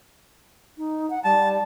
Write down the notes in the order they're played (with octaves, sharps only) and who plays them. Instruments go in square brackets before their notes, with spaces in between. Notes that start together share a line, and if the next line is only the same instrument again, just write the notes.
[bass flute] D#4
F#5
[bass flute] G3 [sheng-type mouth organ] A5